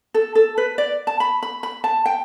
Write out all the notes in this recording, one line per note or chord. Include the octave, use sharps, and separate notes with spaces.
A4
A4
B4
D5
A5
B5
B5
B5
A5
G5